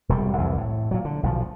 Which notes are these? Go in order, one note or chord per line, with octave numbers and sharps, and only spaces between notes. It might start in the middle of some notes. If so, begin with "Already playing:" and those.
E1 C3 G3
C2 F2 E3
A2
A#2 F#3
D3
B1 A#2 F3